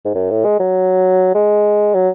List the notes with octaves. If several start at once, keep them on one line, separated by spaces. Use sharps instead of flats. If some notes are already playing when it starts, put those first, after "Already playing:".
G#2
F#2
A2
G#3
F#3
G#3
F#3